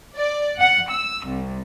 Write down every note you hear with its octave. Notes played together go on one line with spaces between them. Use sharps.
D5
F#5
E6
C2